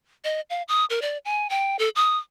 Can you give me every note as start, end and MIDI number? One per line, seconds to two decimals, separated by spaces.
0.24 0.41 75
0.50 0.62 77
0.68 0.85 87
0.90 1.00 70
1.02 1.18 74
1.25 1.48 80
1.50 1.77 79
1.79 1.89 69
1.96 2.17 87